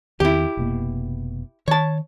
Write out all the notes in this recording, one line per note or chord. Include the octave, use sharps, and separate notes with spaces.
E2 D#3 C4 E4 G4
F1 B2 A#3
D#3 C#5 A5